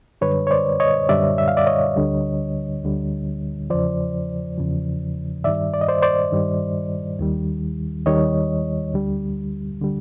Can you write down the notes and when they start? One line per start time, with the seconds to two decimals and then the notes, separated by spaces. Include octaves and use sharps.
0.21 F#2 D3 G3 B4 C#5
0.47 C#5
0.51 C5 D5
0.80 C#5 D#5
1.09 F#2 D3 G3 D5 E5
1.38 E5
1.48 F5
1.57 D5 E5
1.66 C#5 D#5
1.96 D2 D3 G3
2.84 D2 D3 G3
3.70 E2 C#3 F3 C5 D5
4.58 E2 C#3 F3
5.44 G2 D#3 G3 D5 E5
5.74 D5
5.81 D#5
5.88 C5 D5
6.02 C5 D5
6.32 G2 D#3 G3
7.19 D#2 D#3 G3
8.06 D#2 D#3 G3 C#5 D#5
8.93 D2 D3 G3
9.82 D3 G3